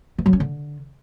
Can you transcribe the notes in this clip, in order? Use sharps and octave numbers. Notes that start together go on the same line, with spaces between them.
E3
F#3
C#4
D3